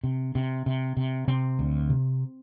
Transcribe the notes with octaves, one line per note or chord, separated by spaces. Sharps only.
C3
C3
C3
C3
C3 C4
D2
C3